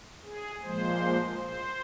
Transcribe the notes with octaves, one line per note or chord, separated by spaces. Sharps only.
G#4
A#2 F3 G#3 C5
C5